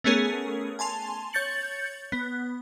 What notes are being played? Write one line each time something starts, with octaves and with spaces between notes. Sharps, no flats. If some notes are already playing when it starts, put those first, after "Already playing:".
A3 B3 C#4 G#4 A#4
G#5 A5 C6 F7
C#5 G6 A6 C#7 F#7
B3